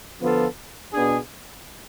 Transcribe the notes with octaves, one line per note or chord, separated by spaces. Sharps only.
D3 F3 B3 F4 A4
B2 B3 D4 G#4